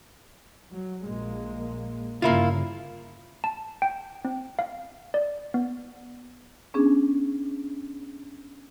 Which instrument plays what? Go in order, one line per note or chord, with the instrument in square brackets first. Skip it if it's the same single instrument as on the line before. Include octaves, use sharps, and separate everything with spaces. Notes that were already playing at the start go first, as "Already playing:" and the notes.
[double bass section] F#3
A#1 G#3 A#3
[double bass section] G1 G2 C#3 [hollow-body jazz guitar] A#3 E4 F4
[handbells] A5
G5
C4
F5
D5
B3
[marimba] B3 C#4 D4 G#4